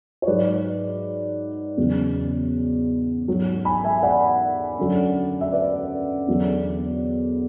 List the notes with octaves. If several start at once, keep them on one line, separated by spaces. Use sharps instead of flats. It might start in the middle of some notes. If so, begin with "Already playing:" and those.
C#5
G#2 F#3 B4 D5
E2 C#3 F#3
G#2 F#3
G#5 B5
E5 G#5
D5 F#5
F#2 D3 F#3
E5
B4 D5
E2 D3 F#3